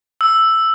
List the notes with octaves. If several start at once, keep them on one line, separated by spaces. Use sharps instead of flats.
E6